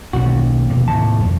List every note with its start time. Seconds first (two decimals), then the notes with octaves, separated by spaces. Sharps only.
0.13 B1 G3 C#4 F#4
0.27 D#2
0.70 F1 B2 A#3
0.88 D#2 A2 C3 A5
1.20 G#1 F2 G3